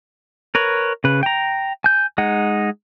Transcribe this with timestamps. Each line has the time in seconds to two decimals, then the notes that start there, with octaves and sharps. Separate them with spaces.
0.55 A#4 B4 C#5
1.04 C#3 B4
1.23 G5 A#5
1.84 G#5 G6
2.18 G#3 D#4 F#5